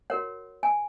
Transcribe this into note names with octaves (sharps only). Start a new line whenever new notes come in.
F#4 A#4 C#5 F#5
G#5